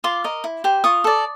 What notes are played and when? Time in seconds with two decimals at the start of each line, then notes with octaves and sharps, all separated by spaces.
0.04 F4 C6 D6
0.24 A#4 D#5
0.44 E4
0.64 G4 C5
0.84 F4 C#6 D#6
1.04 A4 D5